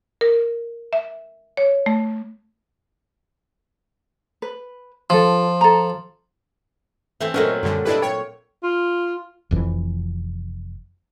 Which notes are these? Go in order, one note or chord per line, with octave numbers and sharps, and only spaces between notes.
A#4
E5
C#5
A3
B4
F3 F4 A4
A4 A#5
E3 A3 C4 E5
A#2 F#3 A3 C#4 A#4 C5 D#5
F#2 D3 G3
D4 E4 G4 A4 B4 D#5
C#5 G5
F4
F1 F2 E3